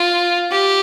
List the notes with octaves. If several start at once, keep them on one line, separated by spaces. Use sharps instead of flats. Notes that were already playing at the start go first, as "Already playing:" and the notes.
Already playing: F4
G4